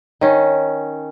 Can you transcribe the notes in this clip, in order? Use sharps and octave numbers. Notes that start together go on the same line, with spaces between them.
D#3 C#4